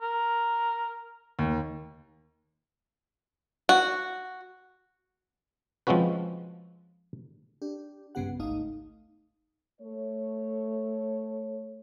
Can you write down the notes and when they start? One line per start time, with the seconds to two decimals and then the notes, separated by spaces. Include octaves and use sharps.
0.02 A#4
1.39 D#2
3.69 F#4
5.87 F3 G#3 C4 C#4 F#4 B4
7.62 D4 G4
8.15 B1 G2 C#3 B3 G4 F#5
8.39 G#1 C#2 A3 D#4 F5 D#6
9.81 A3 C#5